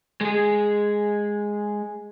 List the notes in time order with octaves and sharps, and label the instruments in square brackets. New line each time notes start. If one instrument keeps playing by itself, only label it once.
[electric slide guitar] G#3 G#4